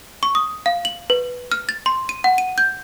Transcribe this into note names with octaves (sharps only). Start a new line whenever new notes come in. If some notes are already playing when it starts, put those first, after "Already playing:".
C#6
D#6
F5
F#7
B4
F6
A6
C6
D#7
F#5
D#7
G6